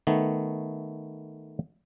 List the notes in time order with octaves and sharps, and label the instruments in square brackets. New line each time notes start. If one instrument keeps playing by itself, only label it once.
[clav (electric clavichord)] D#3 A3 B3